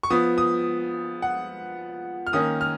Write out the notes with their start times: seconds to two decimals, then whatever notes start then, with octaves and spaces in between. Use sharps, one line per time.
0.03 C#6
0.10 F3 B3 D#6
0.38 D#6
1.22 F#5
2.27 F6
2.33 D#3 A#3 C#4 D#6
2.61 F6